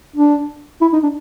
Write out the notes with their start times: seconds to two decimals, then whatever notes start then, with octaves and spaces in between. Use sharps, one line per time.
0.16 D4
0.81 E4
0.93 D#4
1.03 D4